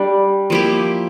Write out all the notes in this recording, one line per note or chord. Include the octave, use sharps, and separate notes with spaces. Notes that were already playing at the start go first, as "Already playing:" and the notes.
Already playing: G3 D4 G4
F3 A#3 E4 G4